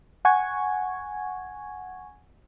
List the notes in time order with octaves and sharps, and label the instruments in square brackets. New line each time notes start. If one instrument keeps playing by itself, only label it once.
[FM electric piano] F#5 G#5 C#6 G#6